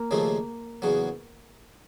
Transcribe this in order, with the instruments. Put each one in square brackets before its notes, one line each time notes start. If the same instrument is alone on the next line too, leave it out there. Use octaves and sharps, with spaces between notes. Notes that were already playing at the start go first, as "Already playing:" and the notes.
Already playing: [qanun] A#3
[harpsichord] D#2 C#3 F3 A3
E2 C#3 F#3